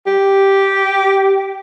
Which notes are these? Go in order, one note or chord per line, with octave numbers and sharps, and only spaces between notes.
G4